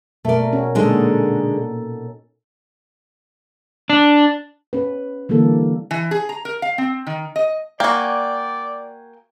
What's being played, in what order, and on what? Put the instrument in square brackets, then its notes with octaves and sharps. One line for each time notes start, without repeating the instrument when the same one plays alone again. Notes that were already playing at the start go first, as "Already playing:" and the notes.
[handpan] B2 A#4 [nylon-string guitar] A3 D5
[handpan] C#4 F#4
[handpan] A#2 D#4 A4 [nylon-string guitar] D3 G#3
[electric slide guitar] D4
[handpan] C#4 B4
D3 E3 G3 A#3 A4
[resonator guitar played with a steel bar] E3
G#4
A#5
A#4
F5
C4
D#3
D#5
[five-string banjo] A#3 F#4 [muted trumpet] D5 [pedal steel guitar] G5 G#5